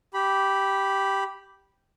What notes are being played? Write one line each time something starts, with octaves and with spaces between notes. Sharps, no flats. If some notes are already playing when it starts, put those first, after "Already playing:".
G4 B5